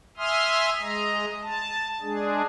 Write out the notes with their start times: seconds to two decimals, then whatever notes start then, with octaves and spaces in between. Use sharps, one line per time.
0.17 E5 G#5 C6 D#6 F6
0.81 G#3 D#5 A#5
1.42 A5
2.02 G#3 D4 G#4